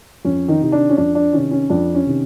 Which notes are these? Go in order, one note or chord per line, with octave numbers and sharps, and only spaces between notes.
F2 C#4
D#3 D#4
C3 D#3
D4
C#4
F2 D4
D4
C3 D#3 C#4
C#4
F2 D4
C#4
C3 D#3